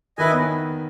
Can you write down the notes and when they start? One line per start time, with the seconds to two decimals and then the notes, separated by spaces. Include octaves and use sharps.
0.18 D#3 E4 B4 D#5 G#5
0.32 B3